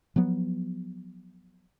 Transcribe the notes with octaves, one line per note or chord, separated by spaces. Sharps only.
F3 F#3 B3